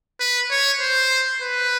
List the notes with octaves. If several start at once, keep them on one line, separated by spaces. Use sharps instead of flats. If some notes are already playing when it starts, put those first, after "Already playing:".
B4
C#5
C5
B4